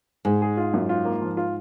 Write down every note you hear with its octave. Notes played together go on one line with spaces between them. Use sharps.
G#2 G#3
G#4
F4
F#2
F4
A#3
F3
F4